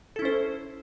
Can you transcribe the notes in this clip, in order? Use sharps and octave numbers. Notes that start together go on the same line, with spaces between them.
C#4 E4 A4 C5